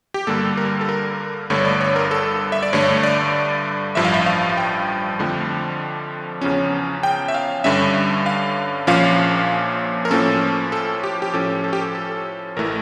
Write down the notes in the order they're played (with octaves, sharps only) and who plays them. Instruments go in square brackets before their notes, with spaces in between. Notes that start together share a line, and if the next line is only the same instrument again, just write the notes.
[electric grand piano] G4
G2 D3 G3 A#3 A4
A#4
A4
A#4
G1 G2 D3 A3 C#5
D5
C#5
A#4
A4
E5
D5
G2 D3 A3 C#5
D5
A1 G2 F3 E5
F5
E5
F5
G5
F2 D3 F3 A3
E2 C#3 F3 C#4
G5
E5
F5
G2 D3 G3 C#4 E5
F5
A#1 A#2 F3 C#4 F5
A#4
A2 F3 A#3 C#4 A4
A4
G4
G4
A2 F3 C#4 A4
A4
G4
A4
A4
A1 E3 A3 A#4